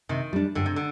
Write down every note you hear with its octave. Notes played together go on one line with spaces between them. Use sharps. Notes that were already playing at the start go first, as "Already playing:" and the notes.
C3 D#3
G3 D4
G2 D3
C3
D3